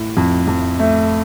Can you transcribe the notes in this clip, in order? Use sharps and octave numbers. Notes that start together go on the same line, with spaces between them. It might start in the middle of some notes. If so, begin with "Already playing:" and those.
Already playing: A2
F2
F2
A3